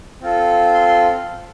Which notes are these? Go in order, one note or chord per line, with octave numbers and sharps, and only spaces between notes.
C4 F4 A4
C6
C6